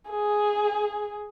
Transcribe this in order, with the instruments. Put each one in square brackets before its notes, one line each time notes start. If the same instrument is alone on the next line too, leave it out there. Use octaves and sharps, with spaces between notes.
[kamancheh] G#4